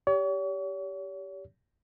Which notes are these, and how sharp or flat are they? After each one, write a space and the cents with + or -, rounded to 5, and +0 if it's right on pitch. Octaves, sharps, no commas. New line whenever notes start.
G4 +0 C#5 +40